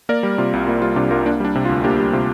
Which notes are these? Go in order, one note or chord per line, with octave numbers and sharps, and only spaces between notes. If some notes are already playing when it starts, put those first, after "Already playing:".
A#3 A#4 D5
G3
C3 F4
C2
A#3 F4
G3 F4
C3 D4 G4
C2 F4 A#4
A#3 D4
G3 D4
C3
F4
D2
A#3 D4 G4
G3
C3 F4